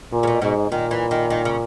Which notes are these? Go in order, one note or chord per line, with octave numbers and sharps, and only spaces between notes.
A#2
C#3
B2
G#2 B2
A#2 D#3
E3
D#3
D#3
C#3